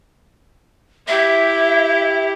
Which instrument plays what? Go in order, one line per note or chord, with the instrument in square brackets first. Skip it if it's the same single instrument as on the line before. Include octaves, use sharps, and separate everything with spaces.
[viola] E4 G4 [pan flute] E5